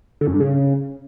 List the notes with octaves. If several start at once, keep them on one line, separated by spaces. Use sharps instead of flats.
D3
F#2
G2
C#3